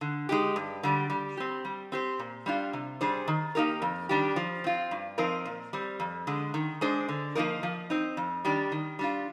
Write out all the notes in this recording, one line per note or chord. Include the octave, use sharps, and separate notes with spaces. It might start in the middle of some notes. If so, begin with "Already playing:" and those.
D3
G#3 D#4 G4
G2
D3 G3
G3
C4 G4
G3
C4 G4 C5
A#2
G3 D4 F4
C3
G3 D4 G#4 C5
D#3
A#3 D#4 G4 A#4
F2
D#3 G3 D4 G4
F3
C4 F4
G2
F3 C4 D#4 A#4
A#2
G3 C4
F2
D3 G#3
D#3
G#3 D4 G#4 C5
D3
F3 A#3 D#4 A#4
F3
C4 D#4
F2
D#3 G3 D4 G4
D#3
G3 D4 F4